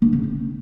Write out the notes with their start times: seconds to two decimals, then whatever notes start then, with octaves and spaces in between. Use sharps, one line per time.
0.02 D3
0.13 C#3
0.24 C4